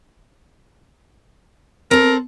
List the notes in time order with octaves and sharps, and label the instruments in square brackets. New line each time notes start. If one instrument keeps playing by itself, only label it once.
[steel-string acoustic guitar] C4 A4 [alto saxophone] A#4